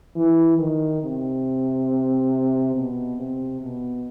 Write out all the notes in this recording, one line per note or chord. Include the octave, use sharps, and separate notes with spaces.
E3
D#3
C3
B2
C3
B2